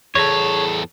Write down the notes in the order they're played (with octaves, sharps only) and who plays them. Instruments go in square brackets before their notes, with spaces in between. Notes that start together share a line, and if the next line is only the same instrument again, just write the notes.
[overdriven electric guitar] E2 A4 [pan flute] G#4 [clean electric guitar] C#5